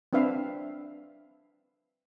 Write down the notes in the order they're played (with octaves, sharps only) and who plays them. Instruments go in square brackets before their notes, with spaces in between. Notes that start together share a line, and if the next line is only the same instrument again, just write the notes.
[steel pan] C4 D4 B4 E5 F5